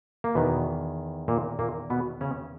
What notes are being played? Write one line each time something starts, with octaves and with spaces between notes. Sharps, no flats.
A#3
E2 B2 D#3 B3
A#2 A#3
A#2 A#3
B2 B3
C#3 C#4